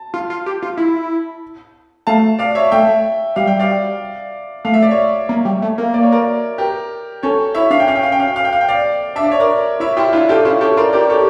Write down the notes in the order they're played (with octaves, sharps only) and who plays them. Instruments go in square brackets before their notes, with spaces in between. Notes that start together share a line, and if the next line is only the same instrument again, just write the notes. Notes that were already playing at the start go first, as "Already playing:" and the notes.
Already playing: [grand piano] A5
[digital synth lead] F4
F4
G4
F4
E4
[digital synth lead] A3 [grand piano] F5 A5
[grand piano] D5 F5
C#5 E5
[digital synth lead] A3 [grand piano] E5 G5
[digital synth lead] G3 [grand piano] F5
[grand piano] G5
D5 F5
[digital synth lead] A3 [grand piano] F5
[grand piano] E5
D5
C#5 E5
[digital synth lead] A#3
G3
A3
A#3
[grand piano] D5
C#5
A#4 D5
G4 A#4
[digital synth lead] C#4 [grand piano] A4 C#5
[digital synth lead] E4 [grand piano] C#5 E5
[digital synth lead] D4 [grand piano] F5
[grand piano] G5
[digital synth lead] C#4 [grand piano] F5
[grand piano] G5
F5
G5
F5
G5
F5
G5
F5
G5
D5 F5
[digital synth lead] D4 [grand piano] E5
[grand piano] D5
C#5
A#4 D5
[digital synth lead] E4 [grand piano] C#5 E5
[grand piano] E4 G4 [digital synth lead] F4
[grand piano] D4 F4 [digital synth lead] E4
[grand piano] F4 A4 [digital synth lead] G4
[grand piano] C#4 E4 [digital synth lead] F4
[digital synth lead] G4 [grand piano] A4 C#5
[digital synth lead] F4 [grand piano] A#4 D5
[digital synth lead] G4 [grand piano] A#4 D5
[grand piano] A4 C#5